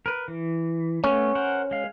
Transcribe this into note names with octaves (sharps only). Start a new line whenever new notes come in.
A#4 B4
E3
A3 B3 C#4
A#4 C5 F#5
G#3 F5